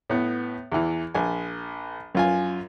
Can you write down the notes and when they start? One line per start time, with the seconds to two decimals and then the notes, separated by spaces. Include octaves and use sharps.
0.10 A2 B3
0.72 E2 E3
1.15 A#1 G#5
2.15 F#2 F4 G#5